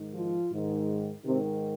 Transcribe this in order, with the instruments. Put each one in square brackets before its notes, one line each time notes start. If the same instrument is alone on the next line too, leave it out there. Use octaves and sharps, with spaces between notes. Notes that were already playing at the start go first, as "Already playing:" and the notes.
Already playing: [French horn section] G#2 D#3
F3 F4
G#2 D#3
G#2 C3 D#3 C4